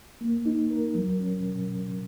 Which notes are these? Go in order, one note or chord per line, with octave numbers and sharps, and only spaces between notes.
A#3
D#4
A#4
F#3
C#4
B2